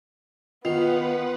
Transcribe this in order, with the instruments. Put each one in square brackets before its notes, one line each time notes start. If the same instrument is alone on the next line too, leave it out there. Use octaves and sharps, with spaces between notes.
[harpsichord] D#3 [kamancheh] B3 [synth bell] F4 [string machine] B4 F#5